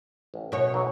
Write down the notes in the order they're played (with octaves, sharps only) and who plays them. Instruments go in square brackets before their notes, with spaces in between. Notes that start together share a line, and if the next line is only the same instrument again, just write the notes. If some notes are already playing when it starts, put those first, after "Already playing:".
[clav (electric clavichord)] A1
[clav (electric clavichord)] F#2 [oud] B2 C#5
[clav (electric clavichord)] B1 F#3